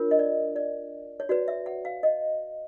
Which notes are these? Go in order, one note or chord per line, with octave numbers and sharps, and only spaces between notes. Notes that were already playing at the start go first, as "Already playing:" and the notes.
Already playing: D4 F4 A#4 C#5
D#5
D5
D5
C#5
F#4 B4 D5
E5
F#5
F5
D#5